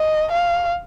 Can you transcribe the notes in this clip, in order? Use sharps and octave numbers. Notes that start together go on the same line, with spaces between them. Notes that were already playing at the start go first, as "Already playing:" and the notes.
Already playing: D#5
F5